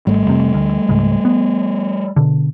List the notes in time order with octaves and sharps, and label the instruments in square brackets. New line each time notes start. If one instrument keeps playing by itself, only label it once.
[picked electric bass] G#1 [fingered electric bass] G3 A3
[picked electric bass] F1 C3
D2
C#2 G#2
B3
B2 D3